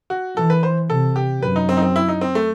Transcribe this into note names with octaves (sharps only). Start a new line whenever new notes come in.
F#4
E3 A4
B4
C5
C3 A4
G4
F#2 B4
D#4
C4
D#4
C4
E4
D#4
C4
A3